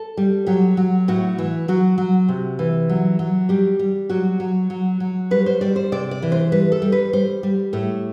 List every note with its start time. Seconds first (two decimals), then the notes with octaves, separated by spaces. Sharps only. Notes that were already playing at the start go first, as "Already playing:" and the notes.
Already playing: A4
0.17 G3
0.46 F#3 G4
0.77 F#3
1.08 A2 F#4
1.38 E3
1.68 F#3 F#4
1.98 F#3
2.29 C3
2.59 E3
2.89 F#3
3.19 F#3
3.49 G3 G4
3.79 G3
4.09 F#3 F#4
4.40 F#3
4.70 F#3
5.00 F#3
5.31 G3 B4
5.46 C5
5.61 G3 D5
5.76 C5
5.92 C3 D5
6.11 D5
6.22 E3
6.32 C5
6.52 G3 B4
6.72 A4
6.82 G3
6.92 B4
7.13 G3 C5
7.43 G3
7.73 A2 A4